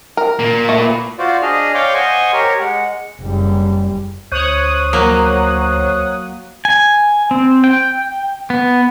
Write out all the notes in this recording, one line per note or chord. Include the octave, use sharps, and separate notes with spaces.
A#4
A#2 A#3
A3
B4
F4 F#4 C5 D5
D4 G#4 D#5 F6
C#5 D5 F5 G5 C6 D6
C5 D#5 F#5 G#5 C6 C#6
G4 A#4 C#5
G#3 F#5
F#1 G3
D2 C5 C#5 D#6 F#6
F#3 A#3
G#5
C4
G5
B3